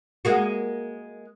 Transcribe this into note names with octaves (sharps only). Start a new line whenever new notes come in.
G#3 A#3 F#4